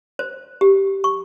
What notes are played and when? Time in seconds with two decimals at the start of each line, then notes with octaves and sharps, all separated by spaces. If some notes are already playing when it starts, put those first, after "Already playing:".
0.19 C5
0.61 G4
1.04 C#6